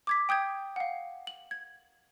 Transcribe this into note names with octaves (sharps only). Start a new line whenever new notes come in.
D6 G#6 B6
G5 D#6 G6 G#6
F5 F#5
F#7
G#6